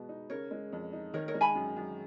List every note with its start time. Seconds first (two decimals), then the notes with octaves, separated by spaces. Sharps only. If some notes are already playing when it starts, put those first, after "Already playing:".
Already playing: B2 G#3 B3
0.09 D#4
0.30 C#3 A#4 C#5
0.51 G#3
0.72 F2
0.93 D#4
1.14 D#3 A#4 C#5
1.28 A#4 C#5
1.34 G#3
1.41 G#5 B5
1.55 F#2
1.76 F#2